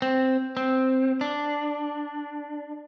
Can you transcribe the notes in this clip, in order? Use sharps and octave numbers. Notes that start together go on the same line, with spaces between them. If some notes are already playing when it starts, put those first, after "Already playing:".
C4
C4
D4